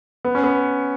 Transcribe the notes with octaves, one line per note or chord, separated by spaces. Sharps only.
B3
C#4
B3